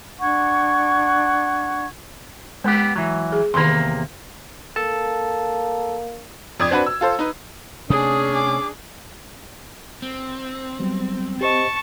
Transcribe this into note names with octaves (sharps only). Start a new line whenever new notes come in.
D4 F#5 C#6 G#6
G#3 B3 G4
E3 F#3
G#4
E2 C3 D#3 A#3 C6
A#3 A4 A5
F2 D5 D#6 G#6
C4 D4 F#4 B4
E6
F4 A4 C5
D#4 B4
C3 A3 C#4 D4 G#4 D#6
D6
C4
F#3 G3 B3
G4 C5 D#5 A5 C#6